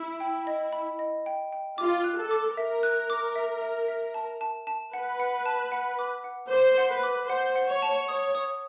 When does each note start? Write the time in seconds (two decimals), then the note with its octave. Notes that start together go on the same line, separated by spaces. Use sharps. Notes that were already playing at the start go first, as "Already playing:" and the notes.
Already playing: E4
0.20 G5
0.47 D#5
0.73 B5
0.99 D#5
1.26 G5
1.53 G5
1.78 F4 D6
2.04 F#6
2.18 A4
2.31 D6
2.57 A#4 E5
2.83 F#6
3.10 D6
3.36 E5
3.61 E5
3.88 E5
4.14 A5
4.41 A5
4.67 A5
4.94 B4 F#5
5.20 F#5
5.46 A5
5.72 F#5
5.99 D6
6.24 F#5
6.50 C5 D6
6.78 F#5
6.90 B4
7.03 D6
7.29 C5 F#5
7.56 F#5
7.69 C#5
7.82 A5
8.08 C#5 D#6
8.35 D#6